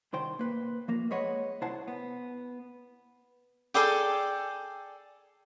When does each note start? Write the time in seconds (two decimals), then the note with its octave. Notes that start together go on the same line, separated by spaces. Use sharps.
0.13 C2 D#3 C5 G5
0.39 A#3 B4
0.88 F3 A#3 A#4
1.11 G#3 B4 C#5 D#5 F#5
1.62 C2 E4 C5 F#5 A5
1.88 B3
3.74 G#4 A4 D5 G5